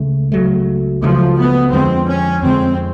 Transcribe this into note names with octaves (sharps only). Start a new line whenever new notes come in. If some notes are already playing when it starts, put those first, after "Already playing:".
Already playing: C#2 C#3 A3
C#2 C#3 F#3 A3
C#2 C#3 F3 F#3 A3
B3
F2 D3 F3 G#3 C4
C#4
F2 D3 F3 G#3 C4